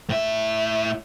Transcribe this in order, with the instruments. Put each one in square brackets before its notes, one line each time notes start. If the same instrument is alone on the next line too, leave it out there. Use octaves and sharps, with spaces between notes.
[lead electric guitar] A2 E5